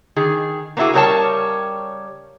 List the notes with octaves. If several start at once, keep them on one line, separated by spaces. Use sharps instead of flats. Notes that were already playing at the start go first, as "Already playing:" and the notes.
D#3 G#4
A#3 B3 D4 E4 F#4 G#4
C#3 G3 A#4 C#5 G5 A5